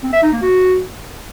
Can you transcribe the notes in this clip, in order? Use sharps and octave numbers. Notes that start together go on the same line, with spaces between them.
C4
E5
D#4
A#3
F#4